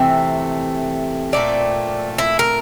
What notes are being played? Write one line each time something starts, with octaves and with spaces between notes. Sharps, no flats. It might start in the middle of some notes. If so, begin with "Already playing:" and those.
Already playing: C3 E3 A3 C4 E5
A#2 A3 C4 D5
E4
A#4